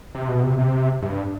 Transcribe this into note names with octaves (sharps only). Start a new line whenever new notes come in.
C3
B2
C3
C3
G2